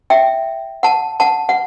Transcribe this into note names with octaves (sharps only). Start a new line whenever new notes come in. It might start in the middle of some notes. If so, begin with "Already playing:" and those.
E5 G5
F#5 A5
F#5 A5
F#5